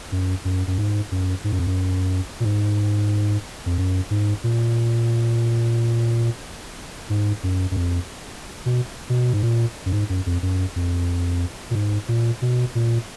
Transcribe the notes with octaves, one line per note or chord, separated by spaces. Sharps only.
F#2
F#2
F#2
G#2
F#2
G#2
F#2
F2
F#2
A#2
G#2
F2
F#2
G#2
A#2
G#2
F#2
F#2
F2
B2
B2
G#2
A#2
F#2
G#2
F#2
F2
F#2
F2
A#2
G#2
A#2
B2
A#2